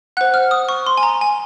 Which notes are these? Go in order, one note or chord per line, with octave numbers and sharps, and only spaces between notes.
C5 F#5 F#6
F6
D#6
C#6
C6
G#5
A#5
G#5